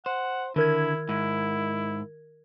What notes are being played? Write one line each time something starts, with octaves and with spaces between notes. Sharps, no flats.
C5 F#5
D3 D#3 E4 A#4 G#6
G#2 E4